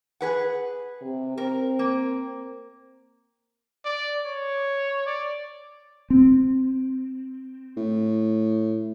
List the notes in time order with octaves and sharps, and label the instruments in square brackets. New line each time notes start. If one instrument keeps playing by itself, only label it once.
[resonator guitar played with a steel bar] G#4 B4 F#5
[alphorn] C3
[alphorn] C4 [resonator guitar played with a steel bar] A#4
[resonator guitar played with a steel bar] A#3
[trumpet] D5
C#5
D5
[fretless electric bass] C4
[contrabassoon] A2